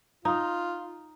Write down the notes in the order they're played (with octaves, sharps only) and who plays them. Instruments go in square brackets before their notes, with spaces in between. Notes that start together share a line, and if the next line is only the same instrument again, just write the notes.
[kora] D#4 [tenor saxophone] F4